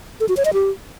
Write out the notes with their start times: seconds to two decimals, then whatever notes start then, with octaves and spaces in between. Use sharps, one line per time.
0.20 A4
0.29 F#4
0.37 C#5
0.45 D#5
0.53 G4